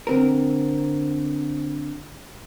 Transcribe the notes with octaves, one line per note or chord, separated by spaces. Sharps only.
D3 C4 A#4